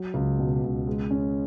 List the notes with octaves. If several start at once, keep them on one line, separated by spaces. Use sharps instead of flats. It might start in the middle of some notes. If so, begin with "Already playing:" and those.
Already playing: F#3
C#2
B2
C#2
G#3
C#4